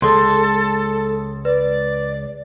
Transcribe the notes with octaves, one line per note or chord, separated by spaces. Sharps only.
C#2 G#3 A4 C6
B4 D5